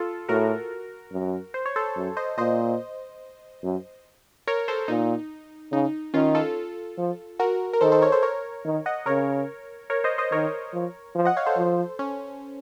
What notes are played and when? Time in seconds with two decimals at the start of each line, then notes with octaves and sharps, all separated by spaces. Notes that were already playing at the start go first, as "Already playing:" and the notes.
Already playing: F4 A4
0.29 A2 F#4 A#4
1.12 F#2
1.54 C5
1.66 C#5
1.76 A4 C5
1.96 F#2
2.17 C5 D#5
2.38 A#2 C5 D#5
3.63 F#2
4.47 A#4 C#5
4.68 A4 C5
4.88 A#2 D#4
5.72 C#3 D#4
6.14 D#3 C#4 F4
6.35 F4 A4
6.98 F3
7.39 F#4 A#4
7.73 A#4
7.81 D#3 A4 C5
7.92 A4 C5
8.02 A#4 C#5
8.12 A4 C5
8.22 A#4 C#5
8.65 D#3
8.86 D#5 F#5
9.06 C#3 A#4 C#5
9.90 A#4 C#5
10.04 C5 D#5
10.18 C5 D#5
10.32 D#3 A#4 C#5
10.73 F3
11.15 F3
11.25 D#5 F#5
11.37 C#5 F5
11.46 A4 C5
11.57 F3
11.99 C#4